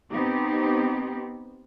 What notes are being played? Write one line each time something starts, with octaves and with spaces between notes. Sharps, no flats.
B3 C4 D#4 G4